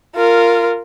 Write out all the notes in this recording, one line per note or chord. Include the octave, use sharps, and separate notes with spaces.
F4 A#4